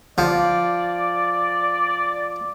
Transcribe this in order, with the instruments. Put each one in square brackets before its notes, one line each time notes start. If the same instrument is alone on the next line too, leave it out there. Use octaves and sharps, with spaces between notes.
[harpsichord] F3 [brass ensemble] D5